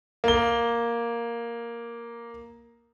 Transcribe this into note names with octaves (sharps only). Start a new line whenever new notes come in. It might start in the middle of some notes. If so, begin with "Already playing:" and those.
A#3 G7